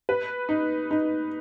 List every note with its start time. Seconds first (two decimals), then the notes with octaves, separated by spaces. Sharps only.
0.09 B4
0.49 D#4
0.91 D#4